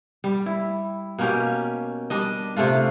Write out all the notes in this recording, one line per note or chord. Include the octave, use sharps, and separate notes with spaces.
G3
E4
B2 A#3 C#4 G4
G3 D4 D#5
C3 A3 D4 F4